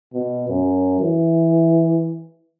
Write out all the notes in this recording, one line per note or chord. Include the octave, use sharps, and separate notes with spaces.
B2
F#2
E3